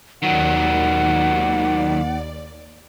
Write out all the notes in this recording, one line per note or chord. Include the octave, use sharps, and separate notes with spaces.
D#2 D#3 F#3 D5 F#5